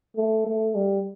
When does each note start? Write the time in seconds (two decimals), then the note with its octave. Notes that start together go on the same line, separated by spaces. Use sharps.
0.17 A3
0.47 A3
0.75 G3